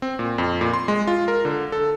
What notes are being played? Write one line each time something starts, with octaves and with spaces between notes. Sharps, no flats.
C4
A#2
F2
A#2
C6
G#3
F4
A#4
D3
A4